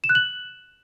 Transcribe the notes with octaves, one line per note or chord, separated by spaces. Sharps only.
E7
F#6
F#7